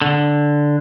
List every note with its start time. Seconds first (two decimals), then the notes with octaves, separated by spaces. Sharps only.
0.02 D3